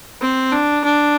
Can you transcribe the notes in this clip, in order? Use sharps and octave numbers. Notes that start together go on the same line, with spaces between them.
C4
D4
D4